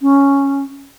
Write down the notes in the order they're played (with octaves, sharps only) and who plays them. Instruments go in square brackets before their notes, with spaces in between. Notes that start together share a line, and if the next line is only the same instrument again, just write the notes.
[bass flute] C#4